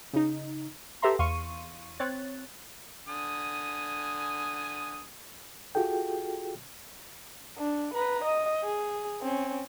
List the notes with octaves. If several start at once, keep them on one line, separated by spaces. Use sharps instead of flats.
C#3 D#4
G4 A4 B4 E5 A#5 C6
E2 F5 C6 C#6 D#7
C4 C#5 F#6 A6
D3 G#5 D#6
F4 F#4 G#4 A4 G5
D4
B4 A#5
D#5
G#4
C4 C#4